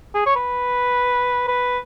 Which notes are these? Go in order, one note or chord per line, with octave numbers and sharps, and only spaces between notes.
G#4
C#5
B4
B4